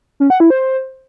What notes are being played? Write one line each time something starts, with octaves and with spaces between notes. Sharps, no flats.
C#4
F#5
E4
C5